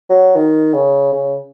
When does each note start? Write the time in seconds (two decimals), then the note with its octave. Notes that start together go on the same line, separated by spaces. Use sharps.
0.10 F#3
0.36 D#3
0.74 C#3
1.13 C#3